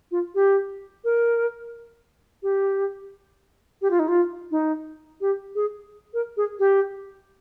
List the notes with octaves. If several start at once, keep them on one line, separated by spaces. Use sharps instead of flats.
F4
G4
A#4
G4
G4
F4
D#4
F4
D#4
G4
G#4
A#4
G#4
G4